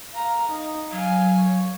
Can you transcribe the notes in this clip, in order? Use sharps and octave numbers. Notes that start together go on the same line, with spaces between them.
F5 A#5
D#4
F#3 F5 G#5
C#5